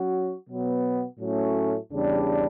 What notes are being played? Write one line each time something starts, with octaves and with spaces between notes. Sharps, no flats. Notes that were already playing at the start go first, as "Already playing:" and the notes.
Already playing: F#3 C#4 F#4
B2 F#3 B3
A2 F#3 A3 C#4
E2 C#3 G3 D4